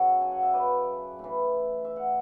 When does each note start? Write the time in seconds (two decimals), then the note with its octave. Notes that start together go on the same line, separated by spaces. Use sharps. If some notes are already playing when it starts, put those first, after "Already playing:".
Already playing: F#2 C#3 F#3 A4 C#5
0.21 G#5
0.31 F#5
0.43 E5
0.54 B4 D5
1.19 A2 E3
1.85 E5
1.96 F#5